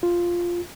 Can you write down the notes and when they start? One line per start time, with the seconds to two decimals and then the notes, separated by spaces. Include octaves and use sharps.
0.03 F4